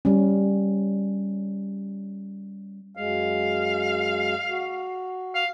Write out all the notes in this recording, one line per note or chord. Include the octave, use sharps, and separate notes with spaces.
G3 C#4
F#2 G#3 F5
F#4
F5